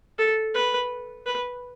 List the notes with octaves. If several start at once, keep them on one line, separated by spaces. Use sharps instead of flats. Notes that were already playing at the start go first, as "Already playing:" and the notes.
A4
B4
B4